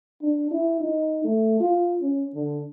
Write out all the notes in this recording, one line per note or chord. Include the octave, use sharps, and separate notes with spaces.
D4
E4
D#4
A3
F4
C#4
D3